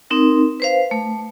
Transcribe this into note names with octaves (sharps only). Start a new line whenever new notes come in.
C4 D#4 A#4
B4 C5 F5
A3